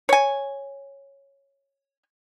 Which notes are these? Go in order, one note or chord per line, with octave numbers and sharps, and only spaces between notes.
C#5 G#5